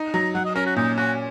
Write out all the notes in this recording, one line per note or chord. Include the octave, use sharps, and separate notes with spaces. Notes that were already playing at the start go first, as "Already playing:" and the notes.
Already playing: D#4
F#3 A#5
F#3 F#5
D#5
C#4 A#4
F#4
A#2 D#4
C#4 F#4